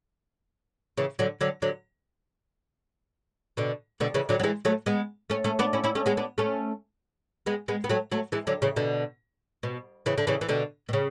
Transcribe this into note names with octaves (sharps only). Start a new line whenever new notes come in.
C#3 E3
D3 F#3
D3 F#3
D3 F#3
B2 D3
B2 D3
C#3 E3
D3 F#3
F#3
E3 G#3
F#3 A3
G#3 B3
A3 C#4
A3 C#4
B3 D4
C#4 E4
C#4 E4
A3 C#4
G#3 B3
B3 D4
A3 C#4
G#3 B3
G#3 B3
B3
F#3 A3
F#3 A3
E3 G#3
D3 F#3
C#3 E3
B2 D3
B2
C#3 E3
D3
C#3 E3
E3
B2 D3
B2
C#3